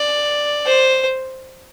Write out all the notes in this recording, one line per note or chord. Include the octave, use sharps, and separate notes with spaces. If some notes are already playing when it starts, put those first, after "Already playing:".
Already playing: D5
C5